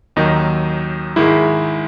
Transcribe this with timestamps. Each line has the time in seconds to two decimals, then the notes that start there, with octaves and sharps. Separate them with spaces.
0.16 D#2 D#3 F#3 D#4
1.16 G#2 D#3 G#3 E4